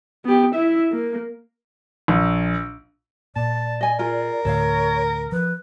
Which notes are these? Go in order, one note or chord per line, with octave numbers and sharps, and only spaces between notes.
B3 G4
E4 E5
A#3
A#1
A#2 D5 A5
D#5 G#5
F4 G#4 A#4
D2 A2 A4 C#5 F5
F3 B4